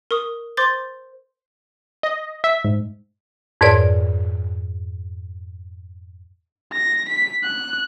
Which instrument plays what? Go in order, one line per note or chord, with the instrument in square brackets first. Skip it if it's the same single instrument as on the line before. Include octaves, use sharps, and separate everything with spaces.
[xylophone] A#4 C#6 D#6
C5 C6 D6 G6 A6
[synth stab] D#5
E5
G#2
[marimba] F2 G#2 A#4 B4 C#5 D5
[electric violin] A#6
B6
F#6